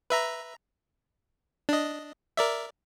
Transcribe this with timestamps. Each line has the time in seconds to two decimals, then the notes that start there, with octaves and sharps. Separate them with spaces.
0.10 B4 E5 A#5
1.69 D4 D#5
2.37 A#4 D5 E5